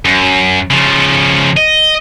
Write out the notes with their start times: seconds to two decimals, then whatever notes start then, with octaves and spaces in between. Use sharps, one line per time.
0.05 F#2
0.71 C#3 F3
1.57 D#5